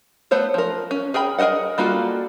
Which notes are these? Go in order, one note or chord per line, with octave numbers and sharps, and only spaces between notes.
A3 B3 C5 C#5
F3 A#4
C#4
G#4 A#4 G5 B5
G#4 A#4 C5 D#5 F#5
G3 A#3 F4 F#4 A4